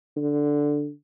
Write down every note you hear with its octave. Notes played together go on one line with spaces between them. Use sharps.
D3